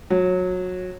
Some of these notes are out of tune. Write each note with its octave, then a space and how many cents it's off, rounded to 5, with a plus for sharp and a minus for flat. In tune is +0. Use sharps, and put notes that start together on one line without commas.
F#3 -20